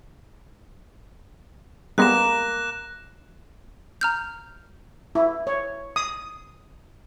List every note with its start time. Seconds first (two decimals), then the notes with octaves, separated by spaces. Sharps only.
1.98 G3 G#3 A#3 B3 A#5 F#6 A#6 E7
4.01 A#5 F6 G6
5.15 E4
5.47 C#5
5.96 D#6